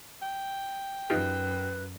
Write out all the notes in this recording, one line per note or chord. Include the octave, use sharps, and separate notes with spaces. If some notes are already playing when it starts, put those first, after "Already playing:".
G5
F#2 D#4 F4 G4 B4